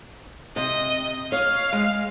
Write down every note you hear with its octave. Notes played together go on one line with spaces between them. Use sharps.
C3 D#5
C#5 F5
G#3